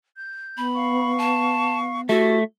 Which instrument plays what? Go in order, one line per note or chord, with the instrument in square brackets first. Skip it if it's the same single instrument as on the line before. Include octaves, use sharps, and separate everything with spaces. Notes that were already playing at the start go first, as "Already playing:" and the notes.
[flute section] G6
[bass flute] B3 [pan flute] B5
[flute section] F5 C#6
[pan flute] A5
[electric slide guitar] A3 [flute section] E4 G4 [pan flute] F#4